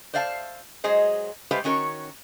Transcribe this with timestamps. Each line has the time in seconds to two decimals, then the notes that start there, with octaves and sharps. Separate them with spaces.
0.14 C5 D5 E5 F5 G#5 A5
0.84 F#3 G#3 G#4 C5 D#5
1.51 G#3 A3 G4 B4 C5 F5
1.64 D#3 C#4 F#4 A#4 C#5